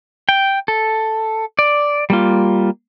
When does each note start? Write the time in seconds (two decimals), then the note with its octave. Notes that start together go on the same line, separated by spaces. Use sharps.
0.29 G5
0.68 A4
1.59 D5
2.10 G3 A#3 F4